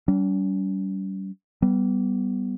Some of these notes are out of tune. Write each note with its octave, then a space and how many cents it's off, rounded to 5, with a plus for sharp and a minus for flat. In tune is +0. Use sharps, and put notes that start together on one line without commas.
G3 -30 C#4 +45
G3 -20 B3 +0